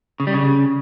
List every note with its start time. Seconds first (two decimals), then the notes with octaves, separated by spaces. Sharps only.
0.20 C#3
0.27 G3
0.34 C#3